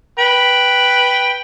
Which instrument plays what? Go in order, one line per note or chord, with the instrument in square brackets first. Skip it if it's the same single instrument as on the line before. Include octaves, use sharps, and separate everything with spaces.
[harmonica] B4 G5